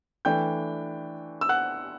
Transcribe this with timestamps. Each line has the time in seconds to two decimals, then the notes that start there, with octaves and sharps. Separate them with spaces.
0.25 E3 A3 D4 G5 G6
1.41 E6
1.49 F#5 F#6